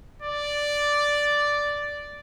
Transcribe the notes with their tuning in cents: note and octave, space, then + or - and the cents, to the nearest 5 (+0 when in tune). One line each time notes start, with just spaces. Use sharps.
D5 -5